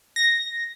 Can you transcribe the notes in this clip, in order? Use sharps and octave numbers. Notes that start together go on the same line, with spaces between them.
A#6